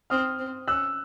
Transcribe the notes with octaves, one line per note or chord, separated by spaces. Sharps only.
C4 D#6 F6
C4
C#4 E6 F#6